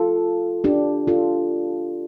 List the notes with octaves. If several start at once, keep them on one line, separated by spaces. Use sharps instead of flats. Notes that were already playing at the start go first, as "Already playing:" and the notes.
Already playing: F4 A4
D4 G4
F4 A4